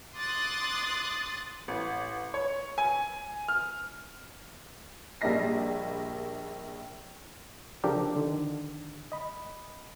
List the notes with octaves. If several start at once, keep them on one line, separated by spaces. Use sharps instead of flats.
C6 D6 D#6 F#6 A6
A1
C#5
G#5
F6
A#1 G3 A#3 D#5 A#6 C7
C#3 F3 D4 G4 A4 A#4
D3 D#3
D#5 B5